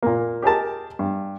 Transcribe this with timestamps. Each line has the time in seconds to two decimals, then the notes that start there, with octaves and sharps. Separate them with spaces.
0.03 A#2 A#3
0.42 G4 G#4 A#4 A5
0.99 G2